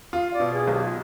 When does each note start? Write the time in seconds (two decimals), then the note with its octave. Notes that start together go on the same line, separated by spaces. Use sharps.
0.13 F4 F5
0.33 D5
0.40 B2
0.53 G#4
0.68 B1
0.74 G4
0.84 F4